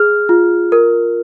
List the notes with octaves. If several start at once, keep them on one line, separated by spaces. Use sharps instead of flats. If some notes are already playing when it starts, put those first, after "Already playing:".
Already playing: G#4 F6
F4
A#4